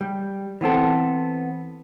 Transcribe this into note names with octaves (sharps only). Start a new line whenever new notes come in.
G3
E3 B3 C4 A4